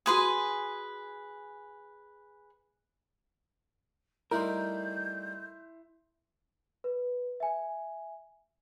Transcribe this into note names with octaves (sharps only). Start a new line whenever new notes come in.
F#4 G#4 B4 G#5 C6 D#6
G3 A3 D#4 E4 A#4 C6 G6
B4
E5 G#5